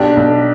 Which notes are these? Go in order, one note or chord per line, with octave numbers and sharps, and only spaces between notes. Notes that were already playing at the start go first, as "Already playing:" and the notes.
Already playing: B1 D4 G4
B1